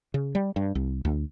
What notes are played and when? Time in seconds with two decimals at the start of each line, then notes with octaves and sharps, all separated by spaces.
0.14 C#3
0.35 G3
0.56 G2
0.75 C2
1.05 D2